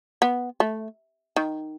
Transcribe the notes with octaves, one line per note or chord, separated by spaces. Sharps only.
B3
A3
D#3